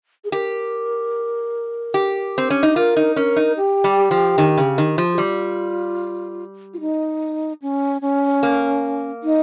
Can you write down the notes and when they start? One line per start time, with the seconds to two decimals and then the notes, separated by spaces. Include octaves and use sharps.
0.24 G#4
0.32 G4 A#4
1.94 G4
2.38 C4
2.50 C#4
2.63 D#4
2.76 F4 A#4
2.97 D#4
3.16 C#4 A#4
3.36 D#4
3.57 G4
3.84 G3
4.11 F3
4.38 D#3
4.58 C#3
4.78 D#3
4.98 F3
5.14 G4
5.18 G3 F4
6.74 F4
6.80 D#4
7.62 C#4
8.01 C#4
8.43 A#3
9.23 D#4